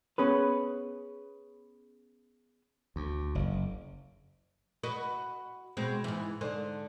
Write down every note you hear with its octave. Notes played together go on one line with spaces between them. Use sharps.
B3 C#4 G#4 B4
D2
F#1
F#4 B4 D#5
B2 G#3 C4
G#2 E3
G#2 D3 C5